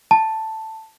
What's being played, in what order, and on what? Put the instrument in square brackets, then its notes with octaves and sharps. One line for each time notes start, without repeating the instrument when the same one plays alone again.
[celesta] A5